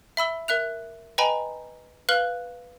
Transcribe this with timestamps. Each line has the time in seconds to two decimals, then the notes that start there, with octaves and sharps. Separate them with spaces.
0.17 E5 B5 E6 G7
0.48 A#4 E5 F#6 F7
1.18 B4 D#5 G5 G#5 A#5 B5
2.09 B4 F5 F6 F#6 F#7 G7